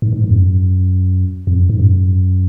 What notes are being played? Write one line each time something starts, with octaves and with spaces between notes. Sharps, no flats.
G#2
G#2
G#2
F2
F#2
F2
F#2
G#2
F#2